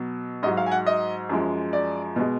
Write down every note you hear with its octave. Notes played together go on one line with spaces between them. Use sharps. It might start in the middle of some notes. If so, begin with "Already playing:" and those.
Already playing: B2 F#3
G#2 F#3 D#5
F5
G#5
F#5
D#5
F#2 F3 G#3
D5
B2 G#3